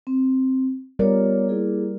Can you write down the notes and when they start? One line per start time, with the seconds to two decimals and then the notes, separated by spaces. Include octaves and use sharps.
0.07 C4
0.99 G3 B3 F4 A#4 C#5 D5
1.49 A#3 E4 G#4